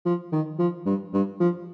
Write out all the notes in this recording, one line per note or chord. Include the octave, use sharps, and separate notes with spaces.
F3
D#3
F3
G2
G2
F3